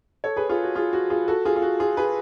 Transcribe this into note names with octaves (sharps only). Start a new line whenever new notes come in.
A4 C#5
G#4 B4
F4 G#4
F#4
F4 G#4
F#4
F4 G#4
F#4 A4
F4 G#4
F4
F#4
F4 G#4
G#4 B4